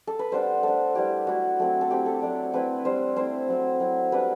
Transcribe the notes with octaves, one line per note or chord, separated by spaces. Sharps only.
A4
B4
G3 B3 D4 C5
A3 D4 A4
G3 B3 E4 G4
F#3 A3 E4 F#4
F#3 A3 C4
A4
A3 C4 E4 G4
A4
F#3 A3 D4
A3 C4 E4 B4
G3 D4 C5
A3 C4 E4 C5
F#3 C4 E4
F#3 C4 E4
G3 B3 D4 B4